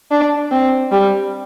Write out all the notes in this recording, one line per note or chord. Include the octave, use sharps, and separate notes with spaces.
D4
C4
G3